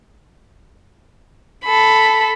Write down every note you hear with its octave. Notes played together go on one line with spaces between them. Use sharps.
A4 B5